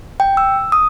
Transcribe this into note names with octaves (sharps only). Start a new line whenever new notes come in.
G5
E6
D#6